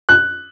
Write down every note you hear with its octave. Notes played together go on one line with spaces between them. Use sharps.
F#6